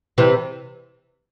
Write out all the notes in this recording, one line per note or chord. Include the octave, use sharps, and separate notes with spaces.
C3 E3